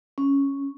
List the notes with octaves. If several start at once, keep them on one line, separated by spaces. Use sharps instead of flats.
C#4